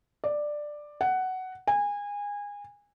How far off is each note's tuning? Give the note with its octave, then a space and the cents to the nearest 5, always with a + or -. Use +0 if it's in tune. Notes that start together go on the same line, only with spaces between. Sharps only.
D5 +10
F#5 +10
G#5 -25